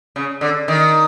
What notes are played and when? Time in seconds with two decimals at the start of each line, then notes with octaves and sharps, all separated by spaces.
0.16 C#3
0.41 D3
0.68 D#3